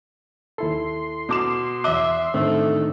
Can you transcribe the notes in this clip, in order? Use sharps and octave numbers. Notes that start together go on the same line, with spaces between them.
D#2 E4 A4 C6
B2 D6 E7
E2 E5 D6 F#6
A2 D3 D#3 A3 C4 A4